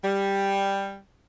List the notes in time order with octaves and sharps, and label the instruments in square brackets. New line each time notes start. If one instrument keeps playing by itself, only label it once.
[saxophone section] G3